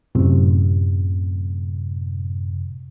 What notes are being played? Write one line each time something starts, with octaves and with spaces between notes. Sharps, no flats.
F#2 A2 C3